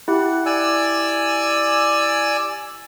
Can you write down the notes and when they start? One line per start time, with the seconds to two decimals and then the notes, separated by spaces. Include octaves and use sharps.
0.08 E4 G4 F#5
0.46 D5 G#5 E6